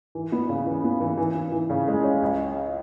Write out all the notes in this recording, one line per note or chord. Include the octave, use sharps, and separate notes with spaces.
E3
B3
C#3
E3
B3
E3
E3
E3
E3
C#3
G#3
C#4
C#2